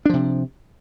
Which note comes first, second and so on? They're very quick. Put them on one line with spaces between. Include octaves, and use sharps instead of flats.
D4 F3 C3